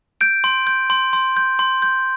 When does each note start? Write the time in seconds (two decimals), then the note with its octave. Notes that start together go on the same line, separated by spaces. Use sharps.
0.21 G6 D7
0.44 C6
0.67 G6
0.90 C6
1.13 C6
1.37 G6
1.59 C6
1.82 G6